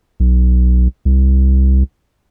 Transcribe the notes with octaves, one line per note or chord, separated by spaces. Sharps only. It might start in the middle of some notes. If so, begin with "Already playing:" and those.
B1
C2